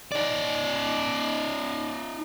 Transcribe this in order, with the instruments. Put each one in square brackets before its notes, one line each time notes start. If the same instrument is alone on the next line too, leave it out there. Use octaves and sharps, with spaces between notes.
[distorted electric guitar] D#4 D5